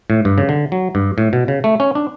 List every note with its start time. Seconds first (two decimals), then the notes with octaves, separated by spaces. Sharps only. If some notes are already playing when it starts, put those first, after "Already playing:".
0.10 A2
0.25 G2
0.38 C#3
0.49 D3
0.72 F#3
0.95 G2
1.18 A2
1.33 B2
1.48 C#3
1.64 A3
1.80 C#4
1.95 D4